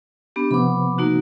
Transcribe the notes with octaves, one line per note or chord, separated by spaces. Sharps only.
B3 D4 G4
C3 F3 B3 B5 D6
A#3 D#4 F#4